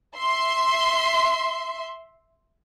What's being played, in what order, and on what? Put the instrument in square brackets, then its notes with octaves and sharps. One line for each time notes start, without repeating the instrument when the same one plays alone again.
[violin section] E5 C6